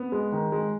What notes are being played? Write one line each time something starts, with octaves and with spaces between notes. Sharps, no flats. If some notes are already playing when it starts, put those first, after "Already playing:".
Already playing: B3
G#3
D#3
G#3